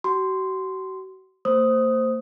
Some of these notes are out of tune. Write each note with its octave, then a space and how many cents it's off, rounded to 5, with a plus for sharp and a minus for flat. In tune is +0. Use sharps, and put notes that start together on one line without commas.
F#4 +40 C6 -10
A#3 -40 C5 +0 D#6 +5